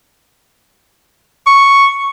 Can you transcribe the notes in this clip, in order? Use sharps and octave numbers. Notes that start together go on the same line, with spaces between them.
C#6